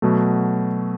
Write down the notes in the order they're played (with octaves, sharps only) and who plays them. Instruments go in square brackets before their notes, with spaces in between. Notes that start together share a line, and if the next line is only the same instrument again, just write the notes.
[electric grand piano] B2 F#3 A3